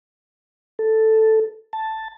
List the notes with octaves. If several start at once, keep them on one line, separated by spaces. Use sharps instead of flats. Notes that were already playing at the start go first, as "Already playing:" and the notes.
A4
A5